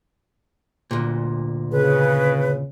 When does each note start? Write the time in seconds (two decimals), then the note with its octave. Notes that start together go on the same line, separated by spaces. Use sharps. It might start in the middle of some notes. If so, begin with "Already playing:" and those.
0.91 D2 A#2
1.72 C#3 B4